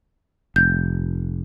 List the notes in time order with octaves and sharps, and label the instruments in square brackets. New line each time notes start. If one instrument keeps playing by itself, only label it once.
[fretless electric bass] F1 [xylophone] G6